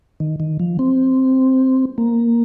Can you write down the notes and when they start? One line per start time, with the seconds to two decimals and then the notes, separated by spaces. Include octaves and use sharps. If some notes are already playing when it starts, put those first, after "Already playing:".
0.20 D#3
0.40 D#3
0.60 F3
0.79 C4
1.98 A#3